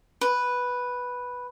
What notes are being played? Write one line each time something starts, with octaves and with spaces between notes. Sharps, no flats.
B4